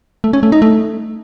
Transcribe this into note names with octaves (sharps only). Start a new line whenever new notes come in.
A3
C#4
A3
D#4
A3